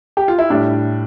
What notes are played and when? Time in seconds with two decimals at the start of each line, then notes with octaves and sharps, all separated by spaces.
0.17 G4
0.28 F4
0.39 E4
0.50 A2 G3 D4